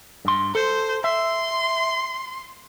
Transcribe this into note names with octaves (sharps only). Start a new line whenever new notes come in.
G2 C6
A4 C5
E5 C6